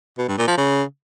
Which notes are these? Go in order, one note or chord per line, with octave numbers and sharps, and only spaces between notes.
B2
G2
A#2
F3
C#3